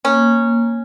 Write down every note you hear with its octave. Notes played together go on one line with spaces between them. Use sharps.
A#3 C#4